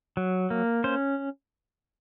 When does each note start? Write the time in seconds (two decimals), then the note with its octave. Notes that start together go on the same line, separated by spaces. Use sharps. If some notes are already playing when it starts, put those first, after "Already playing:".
0.17 F#3
0.50 A#3
0.84 C#4 C5